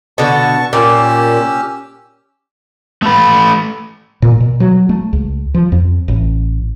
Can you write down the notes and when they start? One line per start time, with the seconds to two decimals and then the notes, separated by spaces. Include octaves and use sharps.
0.18 B2 D3 A5 C#6
0.73 A#2 C#4 G4 E6
3.03 A3 B4
4.22 A#2
4.41 B2
4.60 F#3
4.89 A3
5.13 C#2
5.54 F3
5.72 F2
6.08 A1